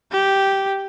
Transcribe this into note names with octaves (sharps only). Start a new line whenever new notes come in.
G4